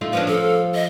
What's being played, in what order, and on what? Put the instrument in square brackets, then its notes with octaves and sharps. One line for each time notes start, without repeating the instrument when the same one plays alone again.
[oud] A3 D#4 F4
[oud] F3 C#4 D4 [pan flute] B4
[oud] F3 [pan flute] A4
[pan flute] D#5